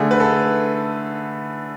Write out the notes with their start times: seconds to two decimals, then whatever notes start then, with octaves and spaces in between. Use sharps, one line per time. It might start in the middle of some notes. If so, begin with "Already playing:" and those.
Already playing: D3 A3 G#4
0.11 B4
0.20 A4